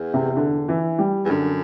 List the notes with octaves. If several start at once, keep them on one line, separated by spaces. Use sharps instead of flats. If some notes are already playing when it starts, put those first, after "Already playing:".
Already playing: E2
C3
D3
E3
G3
E2
F#2 D3